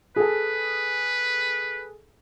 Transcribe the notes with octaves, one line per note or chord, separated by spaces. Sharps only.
G#4 A4 B4